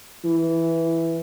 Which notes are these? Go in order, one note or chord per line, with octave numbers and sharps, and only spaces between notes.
E3